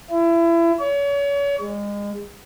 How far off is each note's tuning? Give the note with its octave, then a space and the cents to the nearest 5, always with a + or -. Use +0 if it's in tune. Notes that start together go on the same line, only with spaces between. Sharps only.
E4 +30
C#5 +35
G#3 -30